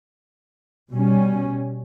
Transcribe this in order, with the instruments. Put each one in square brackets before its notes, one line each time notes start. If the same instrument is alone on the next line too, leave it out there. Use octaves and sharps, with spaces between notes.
[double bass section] B2 G3 C#4